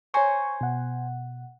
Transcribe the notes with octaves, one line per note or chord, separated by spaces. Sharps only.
C5 C#5 G#5 A#5 C#6
B2 F#5